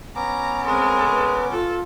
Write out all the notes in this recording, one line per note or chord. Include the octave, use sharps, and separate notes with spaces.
B3 C#4 A#5 D6
G#3 C4 A#4
B4
F4 A4